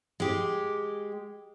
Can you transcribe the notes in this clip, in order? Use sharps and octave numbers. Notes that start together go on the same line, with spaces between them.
G#3 G4